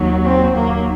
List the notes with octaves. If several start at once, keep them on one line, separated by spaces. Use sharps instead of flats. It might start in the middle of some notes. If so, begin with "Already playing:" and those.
Already playing: D#2 D#3 F#3
C4
D#2 D#3 F#3 A#3